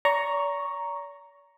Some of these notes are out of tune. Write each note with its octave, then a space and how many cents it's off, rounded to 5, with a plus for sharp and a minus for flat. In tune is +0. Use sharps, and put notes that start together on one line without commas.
D5 -45 A#5 +0 C#6 +0